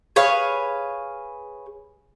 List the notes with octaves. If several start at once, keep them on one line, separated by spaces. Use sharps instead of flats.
G#4 B4 C#5 F5